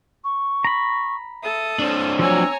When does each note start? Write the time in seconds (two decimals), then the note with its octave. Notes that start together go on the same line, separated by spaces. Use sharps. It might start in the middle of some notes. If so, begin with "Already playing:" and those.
0.24 C#6
0.64 A#5 B5
1.42 A4 E5 D#6
1.79 C4 D4 D5
2.19 F3 F#3 C#5 G#5 A#5 E6